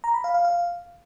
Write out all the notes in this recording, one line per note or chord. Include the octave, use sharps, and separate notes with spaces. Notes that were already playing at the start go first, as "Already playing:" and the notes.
A#5
B5
F5
F5
F5